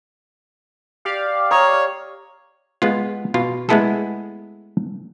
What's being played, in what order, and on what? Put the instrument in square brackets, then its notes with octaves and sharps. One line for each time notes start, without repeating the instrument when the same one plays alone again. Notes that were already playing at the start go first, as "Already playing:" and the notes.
[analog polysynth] G4 D5 F5
[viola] C#5 [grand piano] A#5 D#6
[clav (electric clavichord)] G#3 B3 F4
B2 F4
G#3 A3 B3 E4 G#4 A4